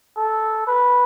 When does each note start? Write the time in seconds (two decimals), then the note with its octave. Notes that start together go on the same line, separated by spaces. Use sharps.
0.17 A4
0.67 B4